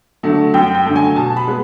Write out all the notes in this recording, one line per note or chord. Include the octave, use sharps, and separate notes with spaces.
D3 F#3 A3
F#2 G5
G5
D3 F#3 A3
G#5
B2 A5
B5
G#3 B3